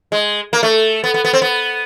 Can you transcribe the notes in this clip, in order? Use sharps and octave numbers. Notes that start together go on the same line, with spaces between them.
G#3
A#3
A3
B3
B3
B3
C4
B3